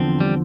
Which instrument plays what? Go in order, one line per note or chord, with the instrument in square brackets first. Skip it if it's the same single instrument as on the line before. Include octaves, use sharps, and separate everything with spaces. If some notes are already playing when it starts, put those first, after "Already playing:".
Already playing: [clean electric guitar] E2 D3 F3 C4
G3